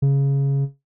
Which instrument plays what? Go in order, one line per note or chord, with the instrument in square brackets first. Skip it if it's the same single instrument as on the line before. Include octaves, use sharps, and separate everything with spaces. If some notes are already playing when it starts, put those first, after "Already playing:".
[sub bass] C#3